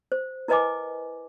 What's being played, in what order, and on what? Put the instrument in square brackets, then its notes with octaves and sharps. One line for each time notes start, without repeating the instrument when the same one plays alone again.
[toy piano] C5
E4 A#4 B4 D#5 G#5 D6